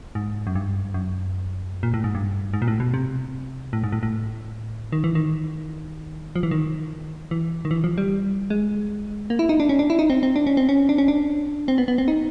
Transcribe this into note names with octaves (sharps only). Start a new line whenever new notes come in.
G#2
F#2
G2
F#2
A#2
A2
G#2
G2
G#2
A#2
A2
B2
C3
A2
G#2
A2
A2
D#3
E3
D#3
F3
E3
D#3
E3
D#3
E3
F3
G3
G#3
A#3
E4
D#4
D4
C#4
D4
E4
D#4
C4
C4
D4
C#4
C4
C#4
D4
C#4
D4
C4
B3
B3
C4
D#4